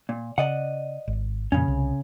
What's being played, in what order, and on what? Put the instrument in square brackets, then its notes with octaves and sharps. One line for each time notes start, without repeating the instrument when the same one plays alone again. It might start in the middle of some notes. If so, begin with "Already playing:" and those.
[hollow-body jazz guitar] A#2
[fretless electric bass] C#3 [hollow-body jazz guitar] D5 D#5 F#5
[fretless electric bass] G#1
[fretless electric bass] F2 A#2 [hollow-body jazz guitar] C#3 C#4
[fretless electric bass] C2